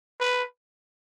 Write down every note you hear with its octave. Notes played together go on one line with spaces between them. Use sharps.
B4